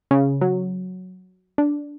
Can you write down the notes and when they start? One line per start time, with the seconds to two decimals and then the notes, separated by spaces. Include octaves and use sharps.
0.11 C#3
0.41 F#3
1.58 D4